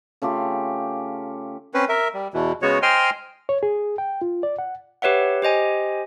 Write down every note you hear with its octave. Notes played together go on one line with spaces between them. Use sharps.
C#3 A3 F4 G4
C4 C#4 B4
A#4 E5
G3
E2 B2 E3
C#3 G#3 B3 F#4 C#5
C5 D#5 G5 G#5 C6 F6
C#5
G#4
G5
F4
D5
F#5
G4 B4 C#5 E5 F#5
G4 C5 D#5 G#5